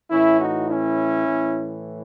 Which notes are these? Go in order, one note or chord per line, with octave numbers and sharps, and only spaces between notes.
A2 E3 C#4 E4
D#4 F#4
C#4 E4
A2 E3